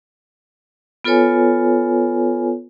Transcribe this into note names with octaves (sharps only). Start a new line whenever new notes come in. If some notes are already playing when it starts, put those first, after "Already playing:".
B3 F4 A4 B4 C#5 G#5